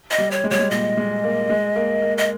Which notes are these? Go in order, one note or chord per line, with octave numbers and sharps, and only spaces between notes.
D#5
G3
C#5
G#3
G3 C#5
G#3
A#2 D#5
G#3
A#3
G#3
A#3
A#3
D#5